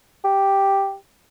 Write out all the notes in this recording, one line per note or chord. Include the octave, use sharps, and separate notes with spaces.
G4